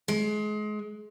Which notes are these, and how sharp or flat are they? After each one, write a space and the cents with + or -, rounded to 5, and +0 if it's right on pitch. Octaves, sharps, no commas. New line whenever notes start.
G#3 +30